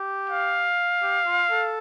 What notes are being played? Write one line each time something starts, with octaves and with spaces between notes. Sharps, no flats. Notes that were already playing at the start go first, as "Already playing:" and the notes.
Already playing: G4
F5
G4
F4
A4